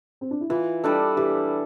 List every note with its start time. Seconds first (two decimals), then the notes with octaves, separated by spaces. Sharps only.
0.21 C4
0.31 D4
0.41 E4
0.50 E3 F4
0.84 G3 D4 A4
1.17 E3 G4